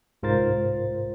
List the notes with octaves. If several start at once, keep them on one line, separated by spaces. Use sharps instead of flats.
C2 G#2 F4 A#4 C5 A6